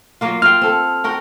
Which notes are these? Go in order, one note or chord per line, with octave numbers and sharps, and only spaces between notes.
F#3 A#3 F4
F4 G5 F6
C4 A4
F#4 A#4 G5